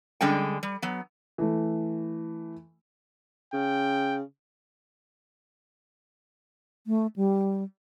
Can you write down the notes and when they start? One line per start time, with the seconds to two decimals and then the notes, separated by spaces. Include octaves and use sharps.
0.21 D3 G3 G#3 C#4 G5
0.63 G3
0.82 F#3 B3
1.38 E3 A3
3.53 C#3 G5
6.87 A3
7.16 G3